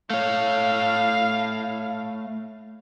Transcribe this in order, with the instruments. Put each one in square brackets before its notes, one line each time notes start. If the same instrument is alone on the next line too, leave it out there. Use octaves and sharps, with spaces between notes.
[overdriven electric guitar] A3 C#5 [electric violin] F5